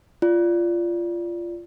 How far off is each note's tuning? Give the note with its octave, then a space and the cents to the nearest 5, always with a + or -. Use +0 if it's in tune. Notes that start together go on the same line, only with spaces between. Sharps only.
F4 -15 D5 -10